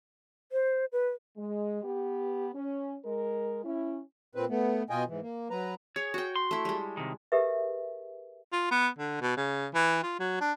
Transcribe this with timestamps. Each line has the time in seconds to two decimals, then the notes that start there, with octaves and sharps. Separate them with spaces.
0.52 C5
0.92 B4
1.37 G#3
1.83 B3 G4
2.55 C#4
3.05 G#3 A#4
3.64 C#4 E4
4.35 A#2 C4 B4
4.49 A3 B3
4.90 B2 F4 D#5 G5 G#5
5.07 G#2 E3
5.22 A#3
5.50 F#3 B4 A#5
5.96 G#4 C#5
6.14 F#4 G5
6.36 C6
6.51 A3 E4
6.65 G3 G#3
6.97 C3 D#3
7.32 G4 G#4 A#4 B4 D#5 E5
8.52 F4
8.71 B3
8.99 D3
9.21 B2
9.37 C#3
9.74 E3
10.03 F4
10.19 F#3
10.40 D4